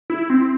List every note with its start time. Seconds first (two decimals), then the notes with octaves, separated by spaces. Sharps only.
0.10 E4
0.30 C4